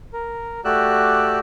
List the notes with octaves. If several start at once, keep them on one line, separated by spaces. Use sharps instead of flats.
A#4
A3 F#4 G4 D5 E6 F#6